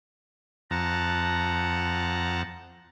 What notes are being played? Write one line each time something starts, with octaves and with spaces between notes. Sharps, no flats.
F2 F#5 A5 A#5